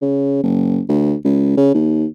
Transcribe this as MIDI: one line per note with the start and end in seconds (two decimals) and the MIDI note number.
0.02 0.41 49
0.43 0.81 30
0.89 1.14 38
1.25 1.56 37
1.57 1.71 49
1.74 2.06 39